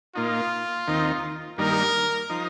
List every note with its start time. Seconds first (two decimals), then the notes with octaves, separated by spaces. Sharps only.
0.16 A#2 A#3 D#4 F4
0.87 D#2 D#3 C4 D#4
1.58 G2 D#3 G3 A#3 D#4 A#4
2.30 F3 D#4